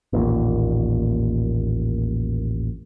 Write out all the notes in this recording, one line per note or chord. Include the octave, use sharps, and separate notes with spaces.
A1 D#2 A#2